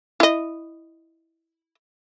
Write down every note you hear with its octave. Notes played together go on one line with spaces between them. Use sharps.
E4 D#5